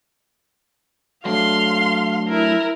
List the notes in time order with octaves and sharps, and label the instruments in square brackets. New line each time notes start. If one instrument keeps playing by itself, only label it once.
[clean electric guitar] F#3 A3 D4 [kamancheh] F5 C6
[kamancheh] E4 A#4